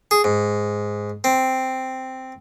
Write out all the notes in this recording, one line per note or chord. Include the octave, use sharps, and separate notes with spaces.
G#4
G#2
C4